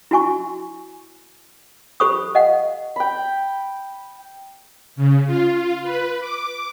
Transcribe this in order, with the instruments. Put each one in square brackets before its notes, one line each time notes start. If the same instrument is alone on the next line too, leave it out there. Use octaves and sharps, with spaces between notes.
[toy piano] E4 F#4 G#5 C#6
G4 A4 C5 B5 C#6 D#6
D#5 F5 F#5
[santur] G5 B5
[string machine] C#3
F4
B4
D6